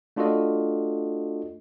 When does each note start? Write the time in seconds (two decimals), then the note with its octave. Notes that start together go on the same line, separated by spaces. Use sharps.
0.16 A3 D4 F4 F#4 A4 D#5